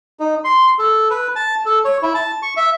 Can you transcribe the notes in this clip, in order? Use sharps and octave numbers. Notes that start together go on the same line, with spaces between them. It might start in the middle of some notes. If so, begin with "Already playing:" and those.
D#4
C6
A4
B4
A5
A4
C#5
E4
A5
C#6
E5